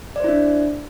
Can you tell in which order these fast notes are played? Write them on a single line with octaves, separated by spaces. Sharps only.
D5 C5 E4 D4